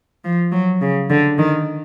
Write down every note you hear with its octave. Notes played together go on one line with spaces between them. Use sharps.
F3
F#3
C#3
D3
D#3